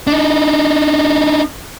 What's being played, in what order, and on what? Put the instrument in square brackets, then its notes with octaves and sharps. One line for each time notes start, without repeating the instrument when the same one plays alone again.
[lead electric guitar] D4 D#4